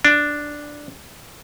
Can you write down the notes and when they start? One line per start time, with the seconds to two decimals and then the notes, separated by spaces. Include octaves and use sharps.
0.05 D4